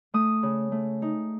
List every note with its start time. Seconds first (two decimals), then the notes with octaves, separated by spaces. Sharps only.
0.14 A3 D#6
0.43 C#3
0.72 A3
1.02 D#4